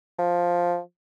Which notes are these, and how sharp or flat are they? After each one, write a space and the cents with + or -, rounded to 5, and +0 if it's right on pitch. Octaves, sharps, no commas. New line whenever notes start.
F3 +5